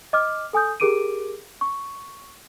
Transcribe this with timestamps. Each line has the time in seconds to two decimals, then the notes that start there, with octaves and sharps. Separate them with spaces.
0.13 D#5 D6 F6
0.53 A4 G#5 D#6 G6
0.80 G4 G#4 A#4 D6 D7 D#7
1.61 C#6